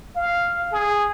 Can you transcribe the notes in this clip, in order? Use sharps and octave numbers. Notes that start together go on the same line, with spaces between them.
F5
G#4